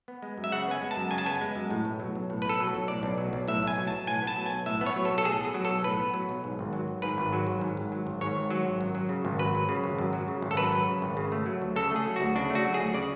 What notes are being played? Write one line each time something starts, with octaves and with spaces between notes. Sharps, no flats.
B3
G#3
F#2
E5
C#3 F#5
B3 G#5
G#3
A5
F#2
C#3 G#5
A5
B3 G#5
G#3
F#2
A2
B1
F#3
B1
A2
B4
B1 A4
F#3
B1
A2 D5
B1
F#3
B1
A2 E5
B1 G#5
F#3
B1 A5
A2 G#5
B3
A5
F#3
B1 G#5
A2 E5
B3
C#5
F#3
A4
B1
A4
A2 G#4
B3 G#4
F#3
B1 A4
A2 B4
B3
F#3
B1
G#2
G#1
F#3
G#1
G#2 B4
G#1
F#3
G#1
G#2
G#1
F#3
G#1
G#2 C#5
G#1
F#3
G#1
F#2
F#3
C#3
G#1
F#2 B4
F#3
C#3
G#1
F#2
F#3
C#3
G#1
A4
F#2 B4
F#3
C#3
G#1
C#3
A3
F#3
D2
C#3 A4
A3 G#4
F#3
D2 F#4
C#3 D4
A3
F#4
F#3
D2 G#4
C#3 D5